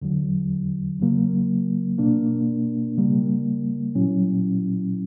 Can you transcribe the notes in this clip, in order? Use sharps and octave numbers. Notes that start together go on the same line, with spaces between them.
E2 D3 F#3
C#3 F#3 A#3
B2 A#3 D4
C#3 G3 A#3
A#2 F#3 C#4 E4